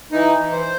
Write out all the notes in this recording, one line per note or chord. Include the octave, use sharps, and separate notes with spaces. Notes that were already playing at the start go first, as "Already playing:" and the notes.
E3 D#4
E3
C5